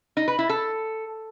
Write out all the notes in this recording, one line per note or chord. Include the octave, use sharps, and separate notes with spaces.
D#4
B4
E4
A4